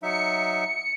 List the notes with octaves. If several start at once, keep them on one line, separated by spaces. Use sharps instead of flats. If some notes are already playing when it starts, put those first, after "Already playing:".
F#3 D#4 E5 C#7